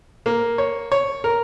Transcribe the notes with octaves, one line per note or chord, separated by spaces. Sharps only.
A#3
C#5
C#5
A#4